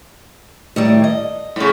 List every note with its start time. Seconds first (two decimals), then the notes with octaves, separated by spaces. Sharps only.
0.76 A2 D#3 G3
1.04 D#5
1.56 A2 C#3